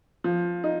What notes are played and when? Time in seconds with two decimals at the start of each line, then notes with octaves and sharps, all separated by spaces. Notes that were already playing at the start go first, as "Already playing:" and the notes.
0.24 F3
0.64 D#4